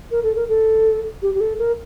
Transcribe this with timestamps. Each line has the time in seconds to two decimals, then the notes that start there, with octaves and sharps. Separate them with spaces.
0.11 A#4
0.23 A4
0.36 A#4
0.49 A4
1.22 G4
1.34 G4
1.40 A4
1.59 A#4